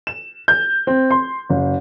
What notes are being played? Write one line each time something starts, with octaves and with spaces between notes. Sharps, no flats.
E7
G6
C4
C6
F#1